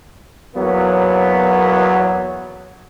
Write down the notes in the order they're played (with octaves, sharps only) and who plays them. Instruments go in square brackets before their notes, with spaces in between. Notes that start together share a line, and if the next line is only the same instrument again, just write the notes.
[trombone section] E2 F#3 A#3 B3